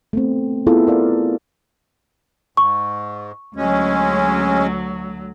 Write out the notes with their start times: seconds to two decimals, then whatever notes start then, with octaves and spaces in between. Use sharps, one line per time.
0.13 A3 B3 C4
0.67 B3 E4 F4 G#4 A4
0.87 A#4 D5 F5
2.57 G#2 C#6
3.56 D2 F#3 G#3 C#4